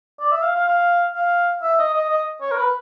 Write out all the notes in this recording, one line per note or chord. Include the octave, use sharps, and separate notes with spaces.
D5
E5
F5
F5
F5
F5
E5
D#5
D#5
D#5
C#5
A#4
B4